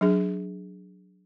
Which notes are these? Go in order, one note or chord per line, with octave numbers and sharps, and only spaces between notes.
F#3 D4 G#4